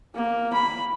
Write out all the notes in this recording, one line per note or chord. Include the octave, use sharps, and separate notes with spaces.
A#3
B5